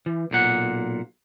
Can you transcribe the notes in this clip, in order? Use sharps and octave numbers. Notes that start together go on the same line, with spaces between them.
E3
B1 A#2 F#5